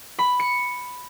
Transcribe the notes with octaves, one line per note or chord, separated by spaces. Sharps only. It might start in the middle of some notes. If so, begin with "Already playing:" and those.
B5
C#7